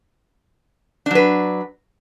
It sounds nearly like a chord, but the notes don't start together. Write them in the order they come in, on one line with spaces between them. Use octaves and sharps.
D4 F#3 B4